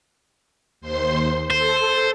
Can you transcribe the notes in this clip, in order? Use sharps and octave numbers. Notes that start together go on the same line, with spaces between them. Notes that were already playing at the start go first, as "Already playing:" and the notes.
D#2 C5 C6
A4 C5